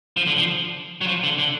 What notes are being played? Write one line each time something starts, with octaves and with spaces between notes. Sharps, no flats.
F3
D3
F3
F#3
F3
D3
D3